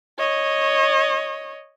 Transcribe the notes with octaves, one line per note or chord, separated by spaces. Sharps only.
C#5 D#5